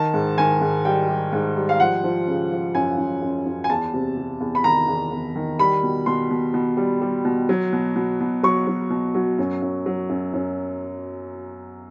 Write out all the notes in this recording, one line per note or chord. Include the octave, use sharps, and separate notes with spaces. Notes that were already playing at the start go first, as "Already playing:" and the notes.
Already playing: D#3 A5
G#2
D#3 G#5
G#2
G3 G5
G3
G#2
G3
F5
F3 F#5
F3
C#3
F3
F#2 G#5
F#2
F#2
F#2
G#5
E2 A5
C3
C3
E2
B5
D#3 A#5
E2
E2
D#3
G3 B5
B2
B2 C6
B2
B2
G3
G3
B2
F#3
B2
B2
B2
F#3 C#6
F#3
B2
F#3
F#2
F#2
F#3
F#2
F#2